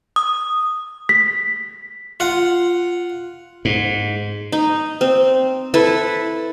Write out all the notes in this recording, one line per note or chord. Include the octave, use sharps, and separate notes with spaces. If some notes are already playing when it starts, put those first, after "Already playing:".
D#6
B6
F4 F#5
G#2
D#4
C4
E4 A4 B4 E5